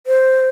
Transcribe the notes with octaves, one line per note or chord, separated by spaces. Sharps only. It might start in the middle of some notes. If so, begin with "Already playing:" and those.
C5